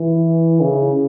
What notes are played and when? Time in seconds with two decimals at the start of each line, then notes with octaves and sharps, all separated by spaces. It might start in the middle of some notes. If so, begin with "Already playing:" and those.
Already playing: E3
0.61 C#3